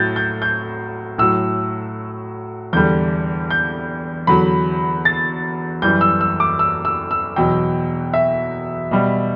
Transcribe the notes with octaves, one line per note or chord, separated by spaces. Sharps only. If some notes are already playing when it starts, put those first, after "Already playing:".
Already playing: A2 F#3 G6 A6
G6
G6
A2 F#3 E6
E2 D3 G3 G6
G6
E2 D3 F#3 B5
A6
F#2 E3 G3 G6
E6
E6
D6
E6
E6
E6
E2 B2 F#3 G5
E5
B2 G3